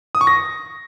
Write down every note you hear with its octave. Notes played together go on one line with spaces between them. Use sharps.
D#6
C#6
A#6